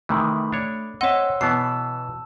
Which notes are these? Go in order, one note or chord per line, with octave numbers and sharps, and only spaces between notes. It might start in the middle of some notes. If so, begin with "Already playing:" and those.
C3 D#3 E3 A3 B5
D4 C#5
C4 C#5 D#5 E5 F#5 C6 E6
B2 E3 B3 A5 E6 C7